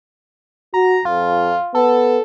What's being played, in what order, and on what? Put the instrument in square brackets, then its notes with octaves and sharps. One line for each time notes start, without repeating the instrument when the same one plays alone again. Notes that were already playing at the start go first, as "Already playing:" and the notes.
[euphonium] F#4 [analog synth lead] A#5
[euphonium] F2 [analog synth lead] F4
[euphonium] B3 [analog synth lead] A4